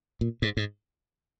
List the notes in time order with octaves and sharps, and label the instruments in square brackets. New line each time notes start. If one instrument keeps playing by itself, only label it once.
[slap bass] A#2
G#2
G#2